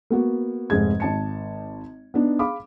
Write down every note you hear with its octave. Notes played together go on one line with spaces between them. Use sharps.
A#3 B3 F#4
F1 G#2 G#3 G#6
G#1 A5 C#7
B3 D4 D#4
G#4 F5 B5 D6